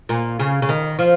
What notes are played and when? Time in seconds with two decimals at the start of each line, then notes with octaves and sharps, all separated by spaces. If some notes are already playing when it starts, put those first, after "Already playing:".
0.09 A#2
0.39 C#3
0.62 C#3
0.69 D#3
0.99 F3